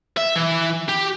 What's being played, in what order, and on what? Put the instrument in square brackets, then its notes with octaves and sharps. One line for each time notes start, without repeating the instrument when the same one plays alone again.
[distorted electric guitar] E5
E3
G4